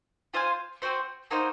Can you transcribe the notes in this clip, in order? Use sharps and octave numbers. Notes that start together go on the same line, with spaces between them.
F4 C5 F5 G#5
C4 F#4 C5
A#3 D#4 F#4 C5